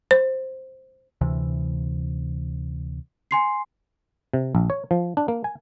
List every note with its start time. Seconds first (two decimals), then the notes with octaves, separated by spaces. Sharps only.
0.11 C5
1.21 D2 C3 E3
3.31 G#5 C6 C7
4.34 C3
4.55 A#1
4.70 C#5
4.91 F3
5.17 D4
5.28 A#3
5.44 G#5